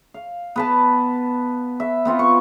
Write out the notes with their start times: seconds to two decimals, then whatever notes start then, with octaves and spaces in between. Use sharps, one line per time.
0.14 F5
0.56 B3 B4 A5
1.80 E5
2.05 B3 C4 F4 F#5
2.19 C#6